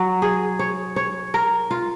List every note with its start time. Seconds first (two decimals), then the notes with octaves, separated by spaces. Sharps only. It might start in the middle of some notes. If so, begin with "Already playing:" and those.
Already playing: F#3
0.22 G#4
0.59 C#5
0.96 C#5
1.34 A#4
1.71 F4